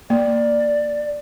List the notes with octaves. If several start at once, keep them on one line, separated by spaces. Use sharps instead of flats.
A#3 D5